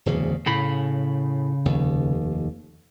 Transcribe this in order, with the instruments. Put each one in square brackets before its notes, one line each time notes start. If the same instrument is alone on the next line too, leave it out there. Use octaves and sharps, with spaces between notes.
[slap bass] D1 E2 C#3
[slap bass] A2 [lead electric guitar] C#3 B5
[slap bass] F1 D#2